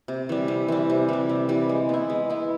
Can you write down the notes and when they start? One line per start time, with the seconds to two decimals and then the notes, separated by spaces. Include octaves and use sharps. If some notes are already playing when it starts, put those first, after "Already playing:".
0.08 C3
0.29 E3 G3
0.48 C3
0.68 E3 G3
0.90 C3
1.09 E3 G3
1.29 C3
1.49 E3 G3
1.69 G#3
1.89 B3 E4
2.10 G#3
2.30 B3 E4